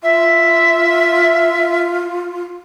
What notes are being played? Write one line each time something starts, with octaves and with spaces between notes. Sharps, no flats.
F4 E5